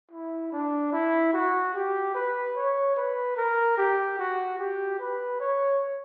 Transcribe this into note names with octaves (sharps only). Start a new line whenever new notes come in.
E4
D4
E4
F#4
G4
B4
C#5
B4
A#4
G4
F#4
G4
B4
C#5